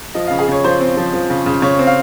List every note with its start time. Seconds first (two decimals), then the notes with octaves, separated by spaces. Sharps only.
0.15 F3 D#5
0.27 C#3 F5
0.39 G#4
0.48 C#3 C#5
0.64 F3 C5
0.80 C4
0.97 F3
1.14 F3
1.30 C#3
1.46 C#3
1.62 C#3 C#5
1.79 C4
1.87 F5